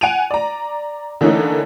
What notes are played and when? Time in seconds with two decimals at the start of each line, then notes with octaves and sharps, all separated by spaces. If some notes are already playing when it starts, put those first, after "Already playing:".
0.01 F#5 G#5 D7 D#7 F7
0.31 D5 A#5
1.21 D3 E3 A3 A#3 C#4 D#4